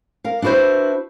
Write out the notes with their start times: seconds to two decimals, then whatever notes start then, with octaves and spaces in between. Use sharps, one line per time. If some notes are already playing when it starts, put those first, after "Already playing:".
0.24 A#4 F5
0.42 D4 E4 F#4 B4 C5